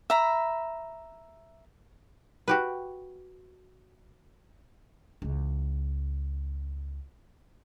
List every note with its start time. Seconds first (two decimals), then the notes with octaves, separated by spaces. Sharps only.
0.10 E5 A#5 B5
2.48 F#4 G4 B4
5.22 C#2 E3